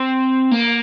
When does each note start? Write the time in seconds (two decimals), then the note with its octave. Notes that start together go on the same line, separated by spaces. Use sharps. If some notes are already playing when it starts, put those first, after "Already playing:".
Already playing: C4
0.52 A#3